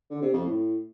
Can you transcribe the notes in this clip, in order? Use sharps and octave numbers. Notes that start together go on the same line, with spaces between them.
D3
C3
F2
A2